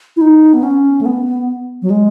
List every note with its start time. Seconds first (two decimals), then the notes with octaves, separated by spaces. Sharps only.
0.17 E4
0.21 D#4
0.54 B3
0.63 C#4
1.01 A3
1.06 B3
1.82 F#3
1.90 G#3